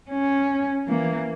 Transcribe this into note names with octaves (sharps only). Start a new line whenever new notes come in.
C#4
E3 A#3